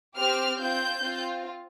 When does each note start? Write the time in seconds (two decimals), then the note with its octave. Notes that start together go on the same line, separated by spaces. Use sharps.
0.18 C4 G4 F6
0.60 C4 F4 G6
1.03 C4 F4